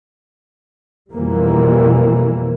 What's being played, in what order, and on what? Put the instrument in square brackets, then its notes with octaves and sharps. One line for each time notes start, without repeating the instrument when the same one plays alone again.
[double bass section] F2 B2 E3 G3 A#3